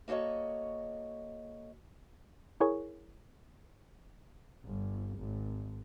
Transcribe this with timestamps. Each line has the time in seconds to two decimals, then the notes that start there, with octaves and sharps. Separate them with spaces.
0.08 A#3 F#4 A4 C#5 D#5
2.60 E4 G#4 A#4 C#5 G#5 C#6
4.63 G1
5.16 G#1